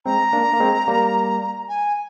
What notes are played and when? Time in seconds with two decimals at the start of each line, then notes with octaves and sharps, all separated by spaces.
0.06 G#3 C4 A#5
0.33 A#3 D4
0.53 A#3
0.60 G#3 C4
0.88 G3 A#3
1.69 G#5